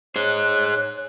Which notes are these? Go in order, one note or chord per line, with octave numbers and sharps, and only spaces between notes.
G#4 C5 C#5 F#6